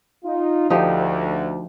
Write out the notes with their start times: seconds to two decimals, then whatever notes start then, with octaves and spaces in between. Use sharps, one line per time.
0.24 D#4 F4
0.70 D2 F3 D#4 G4